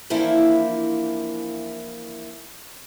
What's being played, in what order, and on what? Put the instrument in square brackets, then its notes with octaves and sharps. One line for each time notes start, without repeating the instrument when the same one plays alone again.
[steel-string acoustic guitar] E3 F3 A#3 D4 E4